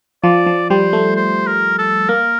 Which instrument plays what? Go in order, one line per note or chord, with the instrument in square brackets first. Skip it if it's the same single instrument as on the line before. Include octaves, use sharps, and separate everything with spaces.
[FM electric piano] F3 [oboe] D5
[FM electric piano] F3
[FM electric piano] G3 [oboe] C5
[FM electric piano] A3
[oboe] C5
A#4
A4
[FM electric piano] A#3 [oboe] A#4